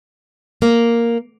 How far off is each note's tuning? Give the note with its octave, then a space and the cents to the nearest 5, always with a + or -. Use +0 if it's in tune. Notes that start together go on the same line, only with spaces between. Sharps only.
A#3 +0